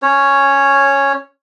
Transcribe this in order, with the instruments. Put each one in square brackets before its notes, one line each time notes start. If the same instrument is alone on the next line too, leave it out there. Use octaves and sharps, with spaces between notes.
[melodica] C#4 C#5